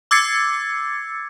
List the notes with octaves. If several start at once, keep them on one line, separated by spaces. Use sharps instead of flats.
D6 E6 G#6 A6 C7 C#7